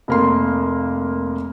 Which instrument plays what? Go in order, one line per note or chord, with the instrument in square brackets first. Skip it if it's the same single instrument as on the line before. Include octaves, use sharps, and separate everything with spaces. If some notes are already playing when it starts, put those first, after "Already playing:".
[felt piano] F1 A#3 C6